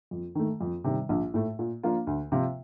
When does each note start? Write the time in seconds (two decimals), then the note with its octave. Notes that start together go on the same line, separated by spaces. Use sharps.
0.11 F2
0.35 D#3 A3
0.61 F2
0.84 C3 D#3 G3
1.09 A#1
1.34 A2 A3
1.59 A#2
1.83 F3 A#3 D4 F4
2.07 D2
2.32 C3 F3 C4 F4